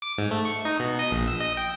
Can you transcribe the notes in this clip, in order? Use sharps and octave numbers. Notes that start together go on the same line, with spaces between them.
D6
G#2
A3
C#6
D#4
B2
D#5
A#1
E6
D#5
G5